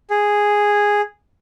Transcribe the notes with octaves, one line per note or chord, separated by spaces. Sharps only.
G#4